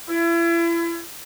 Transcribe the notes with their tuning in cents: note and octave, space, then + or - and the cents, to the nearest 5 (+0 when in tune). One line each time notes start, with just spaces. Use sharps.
E4 +35